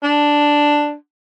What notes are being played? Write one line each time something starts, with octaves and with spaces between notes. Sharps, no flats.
D4